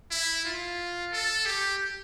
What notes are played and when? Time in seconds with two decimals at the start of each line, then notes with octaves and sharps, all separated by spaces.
0.11 E4
0.45 F4
1.12 A4
1.46 G4